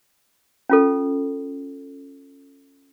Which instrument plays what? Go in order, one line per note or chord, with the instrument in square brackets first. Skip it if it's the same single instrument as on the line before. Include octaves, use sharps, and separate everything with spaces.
[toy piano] C#4 F4 A4